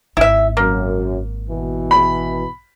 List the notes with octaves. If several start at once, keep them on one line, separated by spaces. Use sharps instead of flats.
G#1 E4 E5
F#2 A#3
B2 E3
B5